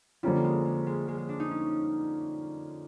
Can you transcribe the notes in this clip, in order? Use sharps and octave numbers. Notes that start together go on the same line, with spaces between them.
D3 F3 G3 A#3 C#4 F4
G#3
G#3
G#3
G#3
G#3
D4
D#4
C#4